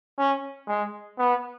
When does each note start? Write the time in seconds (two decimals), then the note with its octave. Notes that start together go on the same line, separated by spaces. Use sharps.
0.19 C#4
0.68 G#3
1.19 B3